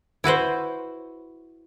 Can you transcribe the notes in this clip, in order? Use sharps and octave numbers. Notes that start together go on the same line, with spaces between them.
E4 F#4 B4 C5